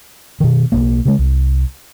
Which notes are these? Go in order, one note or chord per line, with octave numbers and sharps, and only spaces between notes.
B2 D#3
B1 F#2 A#3
C#3 G#3
C2